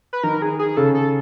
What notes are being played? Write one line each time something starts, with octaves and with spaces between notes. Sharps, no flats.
B4
D#3 A#4
G#4
G#4
C#3 A4
A4